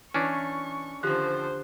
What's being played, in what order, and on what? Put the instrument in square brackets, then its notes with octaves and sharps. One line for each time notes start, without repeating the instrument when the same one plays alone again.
[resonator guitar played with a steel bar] E3 [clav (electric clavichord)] C#4 D4 [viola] C#6
[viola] D3 C5 [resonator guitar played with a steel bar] D#3 F3 [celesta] G4 F#6